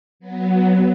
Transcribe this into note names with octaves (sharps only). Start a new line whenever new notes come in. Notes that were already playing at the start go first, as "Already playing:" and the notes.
F#3 B3